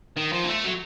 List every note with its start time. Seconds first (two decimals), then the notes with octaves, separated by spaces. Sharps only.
0.17 D#3
0.32 F3
0.44 A#3
0.48 A3
0.64 F#3